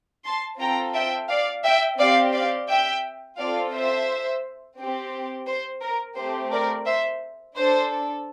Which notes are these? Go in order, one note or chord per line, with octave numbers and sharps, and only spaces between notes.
A5 C6
C4 F4 A4 G5 A#5
E5 G5
D5 F5
E5 G5
C4 G4 D5 F5
D5 F5
E5 G5
C4 F4 A4 D5 F5
C5 E5
C4 G4
C5
A#4
A3 C4 G4 C5
A#4 D5
C5 E5
D4 A4 C5